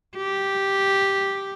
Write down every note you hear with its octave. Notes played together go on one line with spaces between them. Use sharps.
G4